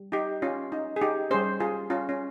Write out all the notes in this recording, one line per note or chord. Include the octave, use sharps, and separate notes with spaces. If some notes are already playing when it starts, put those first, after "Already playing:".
Already playing: G3
D#4 G4
C#4 F4
D#4
G#4
D#4 G4
G3 C#4 G#4 C5
F4 G#4
C#4 F4
C#4